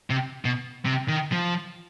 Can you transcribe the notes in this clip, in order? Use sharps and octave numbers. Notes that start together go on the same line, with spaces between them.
C3
B2
C3
D#3
F3